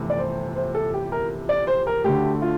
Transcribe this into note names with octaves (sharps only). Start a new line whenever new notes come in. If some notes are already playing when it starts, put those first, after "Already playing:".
Already playing: G1 F2 C3 E3 A3
D5
C5
C5
A4
G4
A#4
D5
C5
A#4
D2 D3 A3 G4
F4